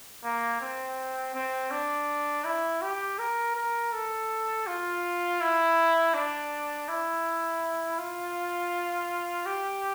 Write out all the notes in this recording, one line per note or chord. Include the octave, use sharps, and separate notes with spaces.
A#3
C4
C4
D4
E4
G4
A#4
A#4
A4
F4
E4
D4
E4
F4
G4